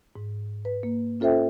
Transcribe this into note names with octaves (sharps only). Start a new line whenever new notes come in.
G#2
B4
A#3
C#4 F4 A4 C5 E5 G5